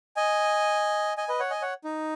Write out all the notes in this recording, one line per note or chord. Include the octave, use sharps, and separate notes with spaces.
D#5 G#5
D#5 G#5
B4 D#5
C#5 F#5
D#5 G#5
C#5 F#5
D#4